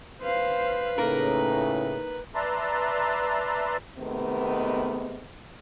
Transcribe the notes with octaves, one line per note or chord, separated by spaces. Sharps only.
B4 C5 F5
A2 C#3 A#3 D#4 A#4
B4 D5 E5 A5 A#5 C6
C3 D#3 G#3 A3 B3